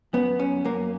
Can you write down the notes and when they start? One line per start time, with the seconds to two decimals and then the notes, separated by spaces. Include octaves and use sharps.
0.13 F#2 B3
0.39 F#2 C#4
0.65 F#2 A#3